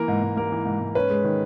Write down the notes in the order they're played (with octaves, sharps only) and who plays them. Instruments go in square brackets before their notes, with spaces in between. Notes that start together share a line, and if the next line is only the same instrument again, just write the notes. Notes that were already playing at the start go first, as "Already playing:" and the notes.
Already playing: [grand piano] E3 A#3 A#4
G#2
G#2
A#3 A#4
E3
G#2
G#2
C#4 B4
G#3
D#3